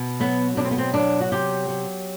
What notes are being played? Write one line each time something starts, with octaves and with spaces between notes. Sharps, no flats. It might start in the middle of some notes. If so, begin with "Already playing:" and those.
Already playing: B2
F#3 B3
B2 D4
C4
B3
C4
F#3 D4
F#4
C3 G4
F#3